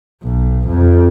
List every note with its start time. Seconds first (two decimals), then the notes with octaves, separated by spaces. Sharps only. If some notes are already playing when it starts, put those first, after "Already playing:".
0.23 B1
0.68 F2